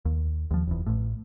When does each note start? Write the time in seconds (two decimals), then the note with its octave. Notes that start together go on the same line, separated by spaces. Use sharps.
0.05 D#2
0.51 D#2 F3
0.67 F1 E2
0.87 A1 A2